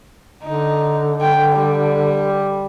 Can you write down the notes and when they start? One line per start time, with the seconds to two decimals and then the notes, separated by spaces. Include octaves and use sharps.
0.43 D3 D#4
1.21 G5
1.52 G3